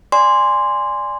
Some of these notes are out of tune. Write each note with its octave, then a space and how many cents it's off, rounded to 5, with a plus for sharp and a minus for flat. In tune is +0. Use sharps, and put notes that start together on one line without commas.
D5 +0 G#5 -10 C6 -5